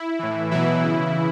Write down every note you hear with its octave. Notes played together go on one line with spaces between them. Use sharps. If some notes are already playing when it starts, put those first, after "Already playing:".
Already playing: E4
A2 E3
B2 E3 F#3 E4
C#3 E3